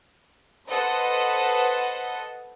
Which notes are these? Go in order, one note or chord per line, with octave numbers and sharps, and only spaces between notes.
A4 B4 C5 D#5 F#5